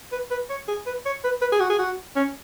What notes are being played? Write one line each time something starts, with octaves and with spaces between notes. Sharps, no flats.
B4
B4
C#5
G#4
B4
C#5
B4
B4
G#4
F#4
G#4
F#4
C#4